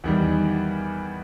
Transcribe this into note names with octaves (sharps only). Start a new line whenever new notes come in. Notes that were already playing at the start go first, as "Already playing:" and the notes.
E2 D#3 G3